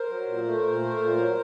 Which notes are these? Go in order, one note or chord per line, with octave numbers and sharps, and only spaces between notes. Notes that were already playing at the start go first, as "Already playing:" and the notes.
Already playing: A#4 C5
F#3
A#2
A3
A#2
A3
A#2
F#3